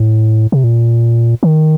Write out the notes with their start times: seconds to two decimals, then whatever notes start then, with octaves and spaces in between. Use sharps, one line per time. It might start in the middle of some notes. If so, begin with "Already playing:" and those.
Already playing: A2
0.52 C3
0.64 A#2
1.43 D#3